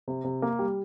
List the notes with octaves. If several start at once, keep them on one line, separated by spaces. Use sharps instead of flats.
C3
C3
A#3
G3